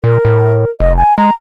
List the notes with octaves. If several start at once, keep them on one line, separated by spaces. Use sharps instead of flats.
A#2 A#4
A2
F1 D#5
G#5
G#3 A#5